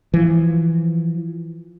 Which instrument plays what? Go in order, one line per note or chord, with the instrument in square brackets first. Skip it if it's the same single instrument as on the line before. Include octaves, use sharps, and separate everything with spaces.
[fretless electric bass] E3 F3